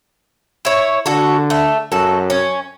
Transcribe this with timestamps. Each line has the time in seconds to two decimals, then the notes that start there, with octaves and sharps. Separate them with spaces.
0.65 E4 C#5
1.06 D3 F#4 A4
1.50 A3
1.92 F#2 F#4 A4
2.30 C#4